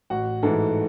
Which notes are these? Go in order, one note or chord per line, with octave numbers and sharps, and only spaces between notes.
A1 F#4 F#5
G#2 E3 A3 A4